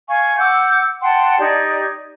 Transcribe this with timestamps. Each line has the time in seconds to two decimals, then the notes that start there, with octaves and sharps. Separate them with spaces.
0.08 F5 G#5 C#6
0.38 F#5 D6 E6 G6
1.02 F#5 G5 A5 C6
1.39 D#4 G4 D5 G#6